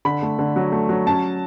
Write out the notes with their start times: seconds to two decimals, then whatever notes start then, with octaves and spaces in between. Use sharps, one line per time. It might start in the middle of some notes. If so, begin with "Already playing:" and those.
0.05 D3 B5
0.23 A3
0.39 D3
0.56 F#3
0.72 A3
0.89 F#3
1.06 C#4 A5